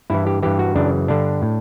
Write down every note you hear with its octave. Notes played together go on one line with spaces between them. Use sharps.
G2 E3 E4
G4
G2 E3 G4
F#4
F#2 C#3 E3 D4
G2 D3 D4
A2